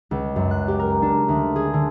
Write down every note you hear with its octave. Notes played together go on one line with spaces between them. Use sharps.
C#2
F#2
F#6
G4
A#4
D4
D2
G#4
D3